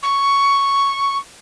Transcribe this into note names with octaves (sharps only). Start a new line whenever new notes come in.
C#6